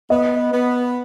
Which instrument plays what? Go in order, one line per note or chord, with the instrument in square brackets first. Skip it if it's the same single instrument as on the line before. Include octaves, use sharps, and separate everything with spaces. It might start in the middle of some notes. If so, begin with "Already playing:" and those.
[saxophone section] B3 [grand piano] D#5
[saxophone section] B3